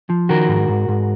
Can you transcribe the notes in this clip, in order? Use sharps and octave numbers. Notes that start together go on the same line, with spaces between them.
F3
D#3 F#4 A#4
G#2
G#2
G#2